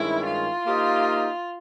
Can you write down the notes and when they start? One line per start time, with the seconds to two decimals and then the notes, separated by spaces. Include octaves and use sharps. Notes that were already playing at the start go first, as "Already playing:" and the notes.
Already playing: G2 D#3 G#3 C#4 E4
0.26 F4
0.66 A#3 D#4 G4 C5 D#5